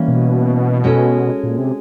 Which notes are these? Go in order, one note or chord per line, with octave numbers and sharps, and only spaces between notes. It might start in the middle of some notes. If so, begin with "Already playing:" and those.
Already playing: E3 G3 A#3 C#4
B2
G#3 C#4 F#4 A4
A#2
C3